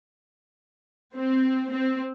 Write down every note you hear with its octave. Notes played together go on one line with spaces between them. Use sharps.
C4
C4